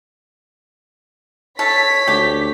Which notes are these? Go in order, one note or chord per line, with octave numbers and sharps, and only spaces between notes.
A4 C#5 B6
D2 G4